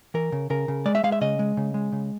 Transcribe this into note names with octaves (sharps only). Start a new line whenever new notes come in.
E3 A#4
C#3
C#3 A#4
C#3
G#3 D5
E5
G#3 F5
E5
C#3 D#5
G#3
C#3
G#3
C#3